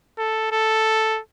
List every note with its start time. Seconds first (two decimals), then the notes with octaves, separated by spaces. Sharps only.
0.19 A4
0.52 A4